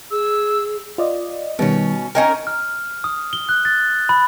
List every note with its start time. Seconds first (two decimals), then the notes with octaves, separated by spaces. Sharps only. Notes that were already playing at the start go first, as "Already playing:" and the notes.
0.11 G#4 E6
0.98 F4 D5 D#5
1.59 B2 D#3 G3 B3 C#4
2.15 C#4 D#4 A#4 G5 G#5
2.47 F6
3.04 D#6
3.33 G7
3.49 F#6
3.65 A6
4.09 B5